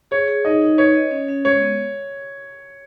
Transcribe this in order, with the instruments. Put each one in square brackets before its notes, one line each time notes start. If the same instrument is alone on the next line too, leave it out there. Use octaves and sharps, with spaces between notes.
[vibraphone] G#4 [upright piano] C#5
[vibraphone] G#4
[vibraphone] D#4 [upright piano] D#5
[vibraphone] D#4
[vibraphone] B4 [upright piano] C#5
[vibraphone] D#5
C#4
C#4
[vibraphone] G#3 [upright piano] C#5
[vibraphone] B3